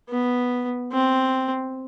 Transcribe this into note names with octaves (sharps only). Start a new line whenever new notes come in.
B3
C4